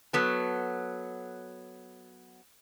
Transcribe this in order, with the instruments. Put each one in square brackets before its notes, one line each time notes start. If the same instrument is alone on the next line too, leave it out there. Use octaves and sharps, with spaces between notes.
[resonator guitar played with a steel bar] F#3 B3 A4